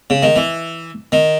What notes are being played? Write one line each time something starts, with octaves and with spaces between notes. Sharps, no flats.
C#3
D#3
E3
D#3